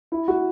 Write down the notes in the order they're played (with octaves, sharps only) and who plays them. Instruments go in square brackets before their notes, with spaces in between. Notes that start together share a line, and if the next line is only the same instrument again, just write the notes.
[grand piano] E4
F#4